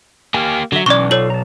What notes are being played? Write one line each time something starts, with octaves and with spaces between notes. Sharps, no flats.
A#3 G4 G#5 F6
D3 F#3 E5
B1 E3 C#4 D5 C#6 D6
F4 A4 C#5 F#7
A5 A#5